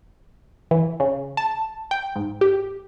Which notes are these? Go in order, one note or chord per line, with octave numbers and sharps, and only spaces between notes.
E3
C#3
A5
G5
G#2
G4